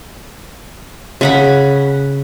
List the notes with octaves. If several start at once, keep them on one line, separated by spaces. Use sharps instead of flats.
C#3 F#5 B5